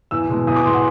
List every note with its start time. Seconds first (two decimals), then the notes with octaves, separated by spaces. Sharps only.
0.11 E2 E6
0.30 B2 G#3
0.47 E2 D#6
0.56 D6
0.65 B2 G#3 C6
0.74 F#5